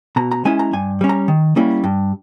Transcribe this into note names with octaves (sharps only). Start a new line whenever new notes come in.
B2 A#5
A#5
G#3 C#4 E4 G#5
A#5
G2 G#5
G3 C#4
A#5
D#3
G3 A#3 C#4 E4
G2